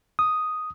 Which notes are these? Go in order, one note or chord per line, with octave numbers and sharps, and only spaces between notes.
D#6